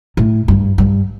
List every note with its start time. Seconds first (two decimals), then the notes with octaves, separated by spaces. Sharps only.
0.17 A2
0.48 G2
0.78 G2